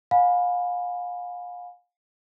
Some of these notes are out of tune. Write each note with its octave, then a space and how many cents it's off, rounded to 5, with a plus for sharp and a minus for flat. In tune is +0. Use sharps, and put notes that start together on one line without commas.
F5 +35 G#5 +0 B5 -5